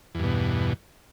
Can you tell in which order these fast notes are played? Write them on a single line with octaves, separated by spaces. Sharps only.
E2 G2 B2